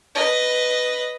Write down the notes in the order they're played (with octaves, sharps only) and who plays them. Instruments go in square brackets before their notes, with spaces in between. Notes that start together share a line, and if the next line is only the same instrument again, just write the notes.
[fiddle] B4 D#5